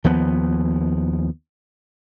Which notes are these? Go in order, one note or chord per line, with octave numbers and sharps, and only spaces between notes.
D#2 F3 B3